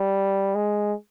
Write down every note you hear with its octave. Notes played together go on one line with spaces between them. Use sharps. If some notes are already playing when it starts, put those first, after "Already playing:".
Already playing: G3
G#3